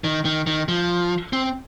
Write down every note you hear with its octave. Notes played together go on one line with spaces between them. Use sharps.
D#3
D#3
D#3
F3
C4